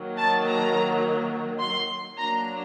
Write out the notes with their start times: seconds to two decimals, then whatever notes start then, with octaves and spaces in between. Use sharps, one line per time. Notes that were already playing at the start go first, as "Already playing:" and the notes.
Already playing: D#3 F#3 A#3
0.18 A5
0.46 A#5
1.61 C6
2.17 F#3 A#3 D4 A#5